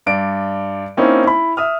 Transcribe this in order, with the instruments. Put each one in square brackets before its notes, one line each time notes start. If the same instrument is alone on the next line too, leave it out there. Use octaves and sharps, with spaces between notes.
[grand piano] G2 D5 D7
A#3 C4 C#4 D#4 E4
E4 B5
E5 D#6 F6